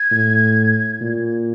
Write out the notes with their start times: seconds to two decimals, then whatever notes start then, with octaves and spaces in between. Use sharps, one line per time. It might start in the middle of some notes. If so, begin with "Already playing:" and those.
Already playing: G#6
0.11 A2
1.01 A#2